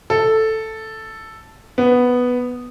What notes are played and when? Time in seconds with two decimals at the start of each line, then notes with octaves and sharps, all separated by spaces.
0.10 A4
1.78 B3